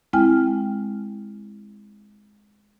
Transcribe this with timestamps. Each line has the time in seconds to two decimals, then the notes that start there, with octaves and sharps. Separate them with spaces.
0.13 G#3 C4 E4 G5 G#5 F6